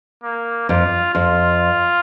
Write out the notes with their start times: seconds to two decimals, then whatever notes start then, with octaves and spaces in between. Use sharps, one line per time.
0.23 A#3
0.69 F2 F4
1.14 F2 F4